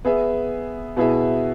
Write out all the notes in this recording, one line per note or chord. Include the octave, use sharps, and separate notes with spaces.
B3 G#4 E5
B2 B3 E4 G#4 E5